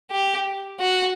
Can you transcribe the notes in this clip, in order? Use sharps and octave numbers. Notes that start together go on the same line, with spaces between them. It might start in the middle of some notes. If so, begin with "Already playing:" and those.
G4
F#4